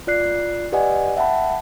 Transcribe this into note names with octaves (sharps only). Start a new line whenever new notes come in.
F4 D5 F#6 C7
G4 B4 D5 D#5 F#5 G#5
E5 F#5 G5 A5 B5